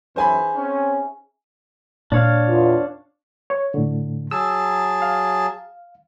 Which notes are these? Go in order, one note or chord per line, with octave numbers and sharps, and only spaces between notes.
F#2 E3 D#4 G#4 C5 E5 G#5 B5
C4 C#4
A#2 D4 C#5 F5
E2 F4
C#5
A2 D3
F#3 G#4 A5 E6
F5